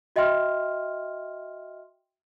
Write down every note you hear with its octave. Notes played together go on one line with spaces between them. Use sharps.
F#4 D#5 E5 G5 C6 F6